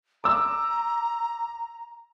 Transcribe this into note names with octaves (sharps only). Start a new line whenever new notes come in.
A#5 D6 E6